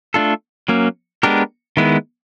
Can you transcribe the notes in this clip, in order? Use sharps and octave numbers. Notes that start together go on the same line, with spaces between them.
A3 D4 F4 A4
F#3 A#3 C#4
G#3 B3 D4 G4 A#4
D#3 G#3 B3 E4